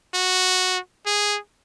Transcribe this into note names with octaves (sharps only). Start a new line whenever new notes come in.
F#4
G#4